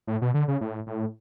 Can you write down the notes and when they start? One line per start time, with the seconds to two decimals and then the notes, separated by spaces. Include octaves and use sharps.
0.07 A2
0.22 B2
0.34 D3
0.48 C#3
0.61 A2
0.87 A2